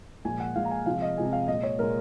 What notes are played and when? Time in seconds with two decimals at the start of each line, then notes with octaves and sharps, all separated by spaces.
0.25 A#2 F3 G#3 G#5
0.40 F#5
0.55 A#2 F3 G#3 F5
0.65 A#5
0.71 G#5
0.86 C3 F3 G#3 F5
1.02 D#5
1.17 C3 F3 G#3 G#5
1.33 F5
1.48 A#2 G#3 D#5
1.63 C#5
1.79 A#2 G#3 A#4